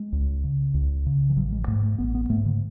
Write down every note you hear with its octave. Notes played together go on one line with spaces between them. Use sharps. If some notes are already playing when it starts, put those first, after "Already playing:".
Already playing: G#3
C#2
C#3
C#2
C#3
E3
A1 F#3
G#3
G#2 A3
A3
A1 B3
B3
G#2 A3
D3